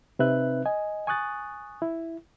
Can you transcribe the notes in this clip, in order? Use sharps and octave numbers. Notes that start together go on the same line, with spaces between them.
C3 C4 D#4 B4 E5 F#6
D#5 G#5
G#5 C#6 D#6 F#6 A6
E4